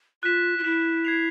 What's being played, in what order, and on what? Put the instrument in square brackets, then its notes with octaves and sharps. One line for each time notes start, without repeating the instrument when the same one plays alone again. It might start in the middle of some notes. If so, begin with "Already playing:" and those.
[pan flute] F4 [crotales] F#6 B6 E7
[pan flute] F4
[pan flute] E4 [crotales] F#6 B6 E7
[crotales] G#6 C7 F7